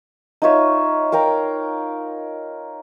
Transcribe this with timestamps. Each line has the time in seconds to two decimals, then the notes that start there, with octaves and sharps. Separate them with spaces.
0.42 D#4 F4 C#5 E5
1.12 A#4 F5 G5 A#5